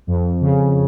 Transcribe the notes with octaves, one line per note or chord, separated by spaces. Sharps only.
F2
C#3